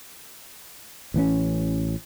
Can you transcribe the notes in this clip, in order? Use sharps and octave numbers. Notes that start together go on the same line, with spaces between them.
A1 E3 A#3 C#4